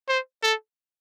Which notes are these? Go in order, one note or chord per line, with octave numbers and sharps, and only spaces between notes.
C5
A4